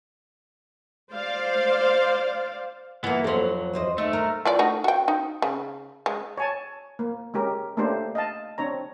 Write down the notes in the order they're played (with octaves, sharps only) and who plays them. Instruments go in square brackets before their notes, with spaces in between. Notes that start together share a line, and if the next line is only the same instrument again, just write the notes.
[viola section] C5 D5 F5
[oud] E3 A#3 [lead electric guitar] B3
[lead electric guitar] F2 F#3 [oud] A4 C5
[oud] E2 C5 D#5
[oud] D#2 [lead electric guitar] A3
[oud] A#4
[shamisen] E3 F4 D5
A3 D#4 F#4
F#4 G5
D#4
C#3
G#3
[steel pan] C#5 G#5 A5
A#3
G#3 C#4 G4 A#4
A3 A#3 C#4 D4 G4 C5
D#5 F5 A5
C4 D4 C#5 A#5